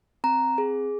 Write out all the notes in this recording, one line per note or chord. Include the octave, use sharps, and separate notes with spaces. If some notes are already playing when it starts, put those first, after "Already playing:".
C4 A#5
G#4